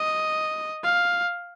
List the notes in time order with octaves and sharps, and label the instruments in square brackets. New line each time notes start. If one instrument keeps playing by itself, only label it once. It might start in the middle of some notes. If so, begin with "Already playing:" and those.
Already playing: [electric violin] D#5
F5